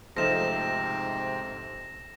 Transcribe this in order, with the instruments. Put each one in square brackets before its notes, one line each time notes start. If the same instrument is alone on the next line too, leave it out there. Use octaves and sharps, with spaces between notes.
[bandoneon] G#2 C3 C4 [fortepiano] F3 A3 D#4 [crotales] A#6 E7